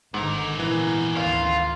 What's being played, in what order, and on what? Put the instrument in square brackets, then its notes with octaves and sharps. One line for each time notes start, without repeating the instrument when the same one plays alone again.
[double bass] G#1 D3 [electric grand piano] G#2 [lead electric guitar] B3 A#4
[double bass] A#2 [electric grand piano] E3
[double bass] G#1 D2 [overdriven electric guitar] F4 F5